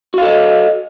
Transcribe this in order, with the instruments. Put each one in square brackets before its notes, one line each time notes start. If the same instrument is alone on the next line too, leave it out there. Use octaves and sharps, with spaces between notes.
[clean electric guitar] F#4
F5
A4
D#5